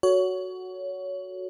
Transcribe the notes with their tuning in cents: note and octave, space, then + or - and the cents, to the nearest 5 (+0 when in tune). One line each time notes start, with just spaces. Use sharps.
F#4 +0 A4 +0 C#5 +20